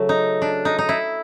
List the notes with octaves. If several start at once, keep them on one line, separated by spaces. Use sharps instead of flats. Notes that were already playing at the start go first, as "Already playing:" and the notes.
Already playing: C#3 F#3 A3
D#4
D4
D#4
D#4
E4